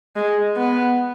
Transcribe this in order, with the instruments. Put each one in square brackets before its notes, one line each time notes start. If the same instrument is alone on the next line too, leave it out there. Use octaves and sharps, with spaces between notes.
[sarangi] G#3
B3